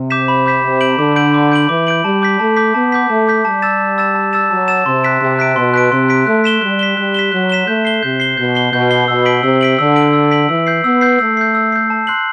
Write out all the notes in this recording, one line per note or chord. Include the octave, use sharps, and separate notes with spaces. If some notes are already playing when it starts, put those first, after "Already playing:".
Already playing: C3
D6 G6 B6 E7
B5
D6 G6 B6 E7
C3 D6
G6 D7 F#7
D3 D6
G6 D7 F#7
D6
G6 D7 F#7
E3 D6
G6 D7 F#7
G3 A5
D6 G6 B6
A3 A5
D6 G6 B6
B3 A5
D6 G6 B6
A3 A5
D6 G6 B6
G3 A5
E6 A6 E7
A5
E6 A6 E7
A5
E6 A6 E7
F#3 A5
E6 A6 E7
C3 C6
F#6 B6 D7
C3 C6
F#6 B6 D7
B2 C6
F#6 B6 D7
C3 C6
F#6 B6 D7
A3 F#6
B6 E7 G7
G3 F#6
B6 E7 G7
G3 F#6
B6 E7 G7
F#3 F#6
B6 E7 G7
A3 G6
C7 G7
C3 G6
C7 G7
B2 G6
C7 G7
B2 G6
C7 G7
B2 E6
B6 D7 F#7
C3 E6
B6 D7 F#7
D3 E6
B6 D7 F#7
E6
B6 D7 F#7
E3 E6
G6 C7
B3 E6
G6 C7
A3 E6
G6 C7
E6
G6 C7
A5
C6 F#6 C7 F#7